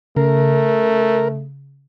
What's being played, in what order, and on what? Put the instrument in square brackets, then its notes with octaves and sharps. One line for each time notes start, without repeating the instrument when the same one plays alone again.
[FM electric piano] C#3 [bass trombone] A3 [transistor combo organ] A#4